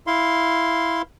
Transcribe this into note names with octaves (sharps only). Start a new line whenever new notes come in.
E4 F5 C6